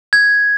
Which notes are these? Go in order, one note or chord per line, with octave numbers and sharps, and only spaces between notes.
G#6